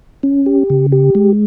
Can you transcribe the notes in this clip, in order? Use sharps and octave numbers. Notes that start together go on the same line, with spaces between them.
C#4
G4
C#3
G4
G#3